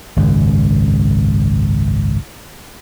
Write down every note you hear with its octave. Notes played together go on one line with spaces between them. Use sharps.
G#1 C#2 F#2